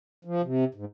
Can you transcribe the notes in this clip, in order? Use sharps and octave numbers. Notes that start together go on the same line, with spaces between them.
F3
C3
G#2